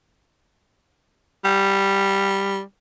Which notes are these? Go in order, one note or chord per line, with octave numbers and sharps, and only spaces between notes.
G3